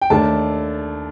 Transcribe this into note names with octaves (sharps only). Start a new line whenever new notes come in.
G5
D#2 D#3 A3 D4 A5